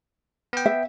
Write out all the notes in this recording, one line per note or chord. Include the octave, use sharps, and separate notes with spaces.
B3 G5
E5